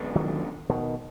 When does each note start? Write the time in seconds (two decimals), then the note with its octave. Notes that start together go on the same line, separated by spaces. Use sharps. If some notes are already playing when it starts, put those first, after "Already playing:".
Already playing: F#2 D3 G#3 B3 D4
0.15 D#3 F#3
0.70 B2 D#3